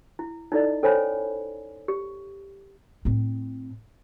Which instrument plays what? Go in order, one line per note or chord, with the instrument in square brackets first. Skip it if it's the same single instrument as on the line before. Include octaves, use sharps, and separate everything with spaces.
[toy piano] E4
D#4 E4 A4 D5 D#5
C#4 A4 C5 C#5 G#5 B5
G4
[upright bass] A2 C4